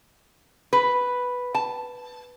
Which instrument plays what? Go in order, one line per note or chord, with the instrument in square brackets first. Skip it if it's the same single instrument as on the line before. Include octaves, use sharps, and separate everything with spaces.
[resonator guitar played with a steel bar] B4
A5